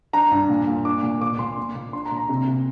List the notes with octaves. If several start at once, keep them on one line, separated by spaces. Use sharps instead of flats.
D4 A#5
G2
A#2
A#2
D4 D6
A#2
A#2 D6
A#2 C6
A#2
A#2
D4 C6
A#5
A#2
A#5
C3
C3